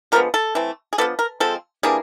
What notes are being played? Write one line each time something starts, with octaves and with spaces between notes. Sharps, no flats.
D3 F3 G#3 B3 A#4
A4
E3 A3 C4
G#4
F3 G#3 B3 D4 A4
A#4
F3 G#3 C4 A4
E3 G3 A#3 D4 G#4